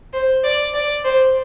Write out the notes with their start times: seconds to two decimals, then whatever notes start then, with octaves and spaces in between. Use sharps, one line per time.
0.13 C5
0.43 D5
0.73 D5
1.04 C5